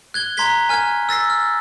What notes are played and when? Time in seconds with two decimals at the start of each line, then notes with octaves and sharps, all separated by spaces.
0.14 F#6 G#6 G7
0.37 A#5 C6 F#6 G#6 B6 G7
0.69 G#5 F6 G#6
1.09 E6 A6 A#6 C7
1.30 F6